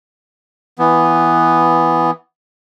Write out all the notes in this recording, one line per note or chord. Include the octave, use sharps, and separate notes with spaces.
E3 B3